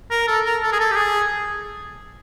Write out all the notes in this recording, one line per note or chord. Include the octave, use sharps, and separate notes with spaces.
A#4
A4
A#4
A4
G#4
A4
G4
G#4